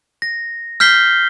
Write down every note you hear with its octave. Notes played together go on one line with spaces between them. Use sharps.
A#6
F6 G6 B6 C7 G7